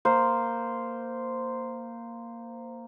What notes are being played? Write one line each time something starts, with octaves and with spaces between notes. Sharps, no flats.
A#3 C5